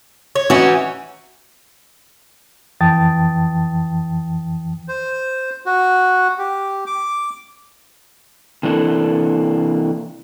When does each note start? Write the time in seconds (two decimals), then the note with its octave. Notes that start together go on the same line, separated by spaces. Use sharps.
0.35 C#5
0.50 E3 C#4 D#4 F#4
2.81 F2 E3 G5 A5 D#6 A6
4.88 C5
5.66 F#4
6.38 G4
6.86 D6
8.63 C3 E3 A#3 D4 E4 A4